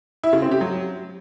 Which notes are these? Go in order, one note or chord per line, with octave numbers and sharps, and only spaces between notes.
E4
C#3
C4
G4
F#3